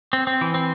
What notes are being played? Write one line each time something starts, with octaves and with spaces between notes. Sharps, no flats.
C4
C4
E3
C4